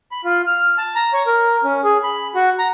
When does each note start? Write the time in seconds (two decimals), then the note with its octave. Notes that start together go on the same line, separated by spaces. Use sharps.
0.11 B5
0.24 F4
0.47 F6
0.78 A5
0.95 A#5
1.13 C#5
1.26 A#4
1.64 C#4
1.84 G#4
2.03 B5
2.35 F#4
2.59 A#5